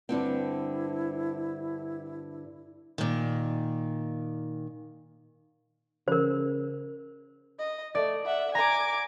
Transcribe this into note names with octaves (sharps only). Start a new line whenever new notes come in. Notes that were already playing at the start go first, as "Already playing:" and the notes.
G2 D3 C4 E4
A#2 D#3
C#3 A#4 C5
D#5
A3 D5
E5 F#5
G#5 A#5 D6